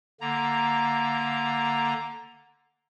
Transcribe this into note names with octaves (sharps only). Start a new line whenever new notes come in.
D3 A#3 A#5